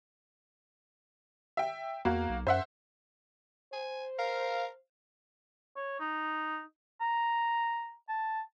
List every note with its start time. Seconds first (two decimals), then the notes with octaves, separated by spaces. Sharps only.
1.57 E5 G5
2.05 E2 A#3 F#4
2.29 B1
2.47 F#2 C5 E5 F#5
3.73 C5 G#5
4.19 A#4 F5
5.76 C#5
5.99 D#4
7.01 A#5
8.08 A5